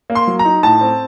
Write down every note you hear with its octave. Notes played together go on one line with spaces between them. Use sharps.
A#3
C6
F#3
A#5
D#4
A2 A5
C4